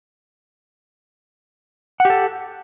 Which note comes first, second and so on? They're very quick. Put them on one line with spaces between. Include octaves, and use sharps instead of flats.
F#5 G4 A4